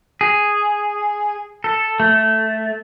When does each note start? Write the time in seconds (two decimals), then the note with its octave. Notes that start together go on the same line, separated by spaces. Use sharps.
0.21 G#4
1.64 A4
2.00 A3